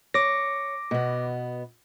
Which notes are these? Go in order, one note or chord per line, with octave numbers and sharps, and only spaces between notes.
C#5 D6 A#6
B2 B3